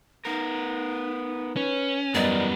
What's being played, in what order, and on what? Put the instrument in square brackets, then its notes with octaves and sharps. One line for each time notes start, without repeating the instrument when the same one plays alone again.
[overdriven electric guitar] B3 A#4 [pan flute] D#4
[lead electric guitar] C#4 [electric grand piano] B4
[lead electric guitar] F#2 G3 [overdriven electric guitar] E3 A#4 [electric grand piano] B3 D#5 [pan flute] D5